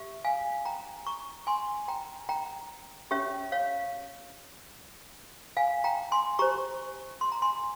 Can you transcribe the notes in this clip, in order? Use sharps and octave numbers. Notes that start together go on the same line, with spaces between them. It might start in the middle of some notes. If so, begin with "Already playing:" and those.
Already playing: G4 E5
F5 G#5
G5 A#5
A#5 C#6
G#5 C6
G5 A#5
G5 A#5
C#4 G4 C#5 E5
C#5 F5
F5 G#5
G5 A#5
G#5 C6
G4 C5 A#5 C#6
C6
A#5
G#5 C6